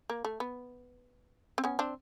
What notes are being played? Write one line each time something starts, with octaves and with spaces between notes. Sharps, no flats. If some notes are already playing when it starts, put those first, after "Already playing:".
A#3
A3
B3
C4
B3 C#4
C4 D4